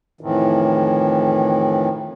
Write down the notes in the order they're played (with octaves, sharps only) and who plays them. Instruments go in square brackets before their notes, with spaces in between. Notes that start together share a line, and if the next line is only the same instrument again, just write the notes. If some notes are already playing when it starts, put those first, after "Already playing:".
[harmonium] F2 A2 D#3 E3